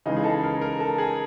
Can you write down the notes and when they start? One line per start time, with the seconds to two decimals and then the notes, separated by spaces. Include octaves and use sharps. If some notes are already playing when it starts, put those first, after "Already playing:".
0.06 C#3 E3 G#3 D#4
0.17 G#4
0.24 A4
0.43 A#4
0.61 A#4
0.80 A4
0.98 G#4